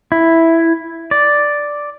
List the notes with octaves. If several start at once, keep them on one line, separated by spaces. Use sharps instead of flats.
E4
D5